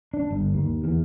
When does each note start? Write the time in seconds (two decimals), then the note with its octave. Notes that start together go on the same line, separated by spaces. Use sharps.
0.14 D4
0.31 G1
0.54 D#2
0.84 E2